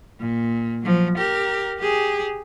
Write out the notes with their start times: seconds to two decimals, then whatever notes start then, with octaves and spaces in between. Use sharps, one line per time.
0.20 A#2
0.82 F3 F#3
1.18 G4 A#4
1.78 G4 G#4